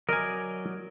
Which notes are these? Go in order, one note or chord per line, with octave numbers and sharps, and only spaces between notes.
F#3 A#4 D5 D#5 G#5